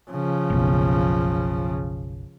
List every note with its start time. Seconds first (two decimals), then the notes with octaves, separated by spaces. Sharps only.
0.11 C#3 F3
0.50 F#1 B1